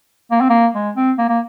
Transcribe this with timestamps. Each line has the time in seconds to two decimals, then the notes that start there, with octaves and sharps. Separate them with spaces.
0.31 A#3
0.41 C4
0.49 A#3
0.75 G#3
0.96 C4
1.18 A#3
1.29 A#3